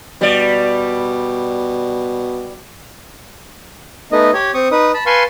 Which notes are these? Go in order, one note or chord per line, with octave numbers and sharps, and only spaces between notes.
B2 G3 D5
A3 B3 D#4 D#5
G4 C#5
C4 C#6 D#6
D#4 B4 D#6
A5 B5
B4 F5 G#5 A5 C6 C#6